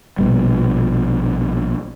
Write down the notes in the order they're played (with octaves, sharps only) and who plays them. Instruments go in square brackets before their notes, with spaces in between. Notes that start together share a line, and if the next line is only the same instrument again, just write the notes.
[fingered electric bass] A#1 B2 G3